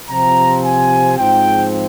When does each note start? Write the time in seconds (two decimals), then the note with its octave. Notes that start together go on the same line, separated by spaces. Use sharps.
0.10 C3 F3 C4 A#5
0.64 G#5
1.17 G#2 F3 C4 G5